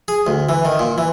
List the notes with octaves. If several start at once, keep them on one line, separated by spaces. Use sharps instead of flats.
G#4
D2
E3
D#3
A#2
E3